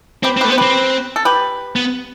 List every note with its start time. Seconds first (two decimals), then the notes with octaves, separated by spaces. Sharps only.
0.23 C4 G4 B4
0.37 C4
0.41 A3 G4 B4
0.49 B3
0.52 C5
0.58 C4 G4 B4
1.16 A4
1.25 G4 B4
1.76 B3